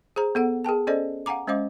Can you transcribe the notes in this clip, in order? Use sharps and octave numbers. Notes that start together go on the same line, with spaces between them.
G#4 C5 A#5
B3 A4 F#5
G#4 A#4 G5 A5
C#4 A4 C5 D5 D#5
F5 F#5 G#5 A#5 D6
G#3 C#4 C5 D#5 F5 D6